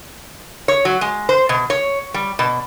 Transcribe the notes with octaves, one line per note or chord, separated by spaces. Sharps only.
C#5
F#3
G#3
C5
B2
C#5
G3
B2